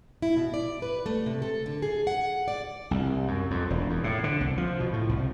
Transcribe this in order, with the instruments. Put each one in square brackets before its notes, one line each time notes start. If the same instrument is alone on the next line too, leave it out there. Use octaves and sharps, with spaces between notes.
[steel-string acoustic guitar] E4
B2
D5
B4
A3
C3
A4
D3
G#4
F#5
D5
[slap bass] C2
F#2
F2
E1
E2
A2
D3
C2
F3
B2
A2
C2